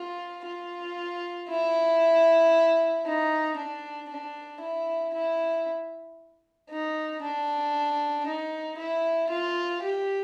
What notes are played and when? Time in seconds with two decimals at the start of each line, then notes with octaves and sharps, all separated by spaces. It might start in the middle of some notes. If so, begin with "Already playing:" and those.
Already playing: F4
0.45 F4
1.49 E4
3.06 D#4
3.57 D4
4.09 D4
4.61 E4
5.14 E4
6.70 D#4
7.22 D4
8.27 D#4
8.77 E4
9.30 F4
9.82 G4